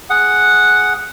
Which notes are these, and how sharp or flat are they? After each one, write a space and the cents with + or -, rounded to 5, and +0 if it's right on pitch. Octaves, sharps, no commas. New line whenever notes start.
G#4 +0 F#5 +0